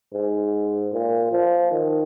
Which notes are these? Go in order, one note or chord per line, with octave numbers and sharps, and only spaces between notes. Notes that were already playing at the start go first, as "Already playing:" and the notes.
G#2
A#2
F3
D#3